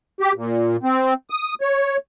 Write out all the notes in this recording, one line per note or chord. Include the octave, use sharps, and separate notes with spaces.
G4
A#2
C4
D#6
C#5